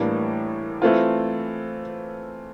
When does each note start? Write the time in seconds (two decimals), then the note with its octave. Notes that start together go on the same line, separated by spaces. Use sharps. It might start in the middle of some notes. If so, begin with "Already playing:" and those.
Already playing: A2 E3 G3 A#3 D4
0.82 E3 A3 C4 F4